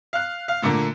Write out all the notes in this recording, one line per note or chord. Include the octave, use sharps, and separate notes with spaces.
F5 F#6
F5
A#2 D3 A3 A#3